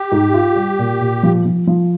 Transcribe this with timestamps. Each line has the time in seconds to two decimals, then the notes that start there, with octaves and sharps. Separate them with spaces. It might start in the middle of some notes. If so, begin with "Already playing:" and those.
Already playing: G4
0.12 G#2
0.34 F4
0.56 G3
0.79 A#2
1.01 A#2
1.23 F3
1.45 F3
1.67 F3